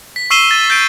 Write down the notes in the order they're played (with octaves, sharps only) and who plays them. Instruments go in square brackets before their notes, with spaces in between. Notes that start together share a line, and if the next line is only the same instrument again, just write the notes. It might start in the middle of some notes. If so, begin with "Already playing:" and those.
[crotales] B6
C#6 E6 C7 D#7 E7 G7
A6
G6 A6 D7